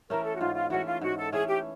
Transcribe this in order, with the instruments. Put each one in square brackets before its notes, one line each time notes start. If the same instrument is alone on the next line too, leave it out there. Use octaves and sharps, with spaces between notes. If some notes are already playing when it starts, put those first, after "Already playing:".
[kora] E3 A3 C#4 [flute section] A#4
[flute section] A4
F#4
[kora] G#2 [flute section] F4
[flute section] F4
[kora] E3 A3 C#4 [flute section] F#4
[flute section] F4
[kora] G#2 [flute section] F#4
[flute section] A4
[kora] E3 A3 C#4 [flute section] G#4
[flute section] G4